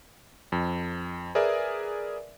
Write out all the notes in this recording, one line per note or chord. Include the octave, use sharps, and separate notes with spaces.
F2
G#4 A#4 B4 D5 E5